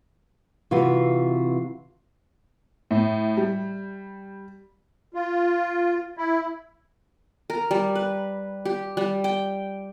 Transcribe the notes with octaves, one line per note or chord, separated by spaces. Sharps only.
C3 E3 F4 F#4
A2
G3
F4
E4
A#4
G3
B4
G4
G3
G5